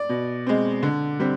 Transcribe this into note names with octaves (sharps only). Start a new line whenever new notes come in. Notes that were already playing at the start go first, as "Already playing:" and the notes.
Already playing: D5
B2
G#3 C4
D3
G3 C4